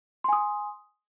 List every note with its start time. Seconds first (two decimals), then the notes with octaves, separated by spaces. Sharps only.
0.24 C6
0.29 G#5
0.33 D#6